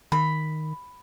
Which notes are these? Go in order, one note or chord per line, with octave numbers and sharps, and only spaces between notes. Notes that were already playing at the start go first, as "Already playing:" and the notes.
D#3 B5